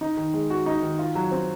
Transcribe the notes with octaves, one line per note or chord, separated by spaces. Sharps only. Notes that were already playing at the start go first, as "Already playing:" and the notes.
D#4
D#3
G#3
F#4
D#4
D#3
F4
F#3
C4